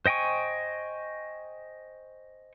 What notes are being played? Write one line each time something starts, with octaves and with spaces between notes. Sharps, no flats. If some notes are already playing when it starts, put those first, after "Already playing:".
C5 D#5 G5 G#5 C#6